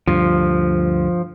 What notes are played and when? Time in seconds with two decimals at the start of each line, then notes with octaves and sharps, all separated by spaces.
0.08 D2 G2 F3